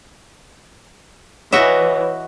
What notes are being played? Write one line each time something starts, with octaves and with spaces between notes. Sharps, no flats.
E3 F#4 C#5 D#5 E5